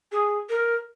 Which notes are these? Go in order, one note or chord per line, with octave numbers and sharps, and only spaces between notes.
G#4
A#4